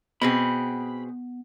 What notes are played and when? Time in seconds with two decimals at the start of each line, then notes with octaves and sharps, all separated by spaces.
0.22 B2 B3 C4 G#4 B5